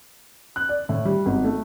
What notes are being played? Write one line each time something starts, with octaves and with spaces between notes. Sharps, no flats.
F#6
D5
A2
G3
G#1
A3